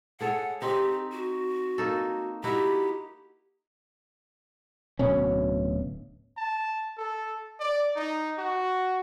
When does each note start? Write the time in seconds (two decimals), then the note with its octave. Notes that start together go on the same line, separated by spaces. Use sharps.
0.21 G#4 A4 C#5 F#5
0.62 C4 D#4 G4
1.12 F#4
1.78 A#3 D#4 A4
2.44 D#4 E4 F#4 G4
4.99 D1 B2 C#4
6.37 A5
6.97 A4
7.60 D5
7.96 D#4
8.38 F#4